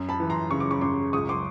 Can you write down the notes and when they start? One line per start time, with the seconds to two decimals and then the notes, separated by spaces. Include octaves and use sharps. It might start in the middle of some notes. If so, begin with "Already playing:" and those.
Already playing: F#2
0.09 A5 B5
0.20 E3
0.30 A#5 C6
0.51 C#3 C#6
0.60 D6
0.71 B5 C#6
0.81 F#2 C6 D6
1.13 C#2 C#6 D#6
1.29 C6 D6